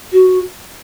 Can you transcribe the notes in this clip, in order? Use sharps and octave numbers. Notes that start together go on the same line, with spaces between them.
F#4